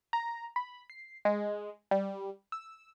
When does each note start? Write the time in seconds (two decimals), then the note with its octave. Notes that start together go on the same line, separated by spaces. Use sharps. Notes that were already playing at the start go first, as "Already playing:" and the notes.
0.13 A#5
0.56 B5
0.90 C7
1.25 G#3
1.91 G3
2.52 E6